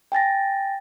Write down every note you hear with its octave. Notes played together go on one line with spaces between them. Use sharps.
G5 G#5 A6 A#6